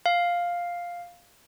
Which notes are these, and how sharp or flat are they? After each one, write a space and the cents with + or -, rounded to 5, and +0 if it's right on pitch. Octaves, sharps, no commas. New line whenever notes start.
F5 +5